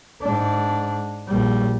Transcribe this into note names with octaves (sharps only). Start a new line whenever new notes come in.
G#2 D4
A#1 G3